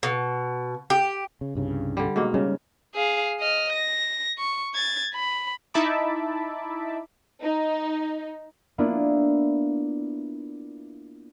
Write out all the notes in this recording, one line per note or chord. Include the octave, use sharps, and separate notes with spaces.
B2
G4
C#3
C2 G2 C#3
D3 G3
G#2 B2 A#3
C#3 G3 C#4
G#4 F5
D#5 F6
A#6
C#6
G#6 A6
B5
D#4 E4 E5 A5 B5 D6
D#4
A#3 B3 D4 E4 F4